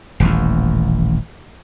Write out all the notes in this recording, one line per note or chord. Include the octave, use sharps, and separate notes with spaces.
D#1 A1 D#2